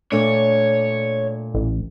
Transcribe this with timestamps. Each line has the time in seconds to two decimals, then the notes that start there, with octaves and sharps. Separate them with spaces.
0.12 A#2 A3 D4 C#5
1.55 A1